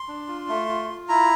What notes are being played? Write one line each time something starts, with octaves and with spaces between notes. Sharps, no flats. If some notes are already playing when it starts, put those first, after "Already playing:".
Already playing: C6
D4
F4
A3
F4
F4
E4 A#5